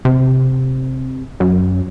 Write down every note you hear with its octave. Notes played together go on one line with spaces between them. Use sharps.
C3
F#2